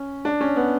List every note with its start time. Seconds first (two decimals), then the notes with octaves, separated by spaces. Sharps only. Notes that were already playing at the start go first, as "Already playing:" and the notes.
Already playing: C#4
0.25 D4
0.41 C#4
0.56 B3